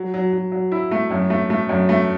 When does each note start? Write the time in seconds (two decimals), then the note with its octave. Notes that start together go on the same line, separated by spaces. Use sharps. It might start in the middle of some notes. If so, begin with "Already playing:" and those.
Already playing: F#3
0.14 F#3
0.33 F#3
0.52 F#3
0.72 E4
0.91 A3
1.11 F#2
1.30 A3
1.50 A3
1.69 F#2
1.89 A3